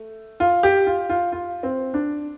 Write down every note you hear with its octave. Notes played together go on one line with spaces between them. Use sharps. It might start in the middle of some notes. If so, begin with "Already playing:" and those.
Already playing: A3
F4
G4
F4
F4
F4
C4
D4